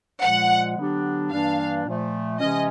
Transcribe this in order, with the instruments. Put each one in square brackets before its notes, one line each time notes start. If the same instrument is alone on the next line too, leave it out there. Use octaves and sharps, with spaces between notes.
[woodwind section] A#2 F3 G#3 [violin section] F#5
[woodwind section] D3 F#3 B3 D4 G4
[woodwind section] G2 E3 G3 A#3 D4 [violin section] F5
[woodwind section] A#2 F3 A3
[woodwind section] C3 E3 G#3 C#4 [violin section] D#5